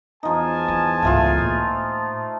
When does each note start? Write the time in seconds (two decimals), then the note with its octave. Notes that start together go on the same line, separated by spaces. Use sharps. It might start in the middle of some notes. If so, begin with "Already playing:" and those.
0.23 E2 F3 D#4 G#5 A5
0.68 F4
1.03 C#2 G#2 F3 A3 F4
1.38 A2 A#3